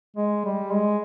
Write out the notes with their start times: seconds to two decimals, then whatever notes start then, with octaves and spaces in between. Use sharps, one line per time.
0.17 G#3
0.45 G3
0.72 G#3